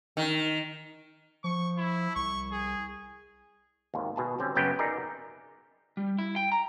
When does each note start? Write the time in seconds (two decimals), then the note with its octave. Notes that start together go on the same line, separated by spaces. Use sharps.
0.17 D#3
1.44 F3 C#6
1.78 E4
2.16 C2 C#6
2.52 G#4
3.94 G#1 D#2
4.16 B2 G#4 A5
4.39 D3 G3 C4 C#4
4.55 F#2 C#3 B3 G5
4.79 D#4 G#4 A#4 D5 E5
5.97 G3
6.19 E4
6.36 G5
6.52 A#5